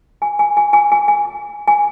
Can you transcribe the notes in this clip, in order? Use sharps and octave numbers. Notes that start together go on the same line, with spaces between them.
G#5
G#5
G#5
G#5
G#5
G#5
G#5